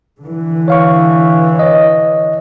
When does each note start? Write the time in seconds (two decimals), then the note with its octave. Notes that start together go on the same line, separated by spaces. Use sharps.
0.21 D3 E3
0.68 C#5 F5 C#6
1.59 C#5 D#5